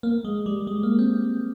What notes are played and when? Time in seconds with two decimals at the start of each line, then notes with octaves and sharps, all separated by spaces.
0.03 A#3
0.25 G#3
0.46 G3
0.67 G#3
0.83 A#3
0.99 C4